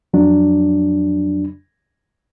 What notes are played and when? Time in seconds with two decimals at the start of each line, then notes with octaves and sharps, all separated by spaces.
0.14 F2 F#3 D4